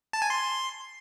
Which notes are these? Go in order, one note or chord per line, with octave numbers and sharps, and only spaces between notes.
A5
G#5
C6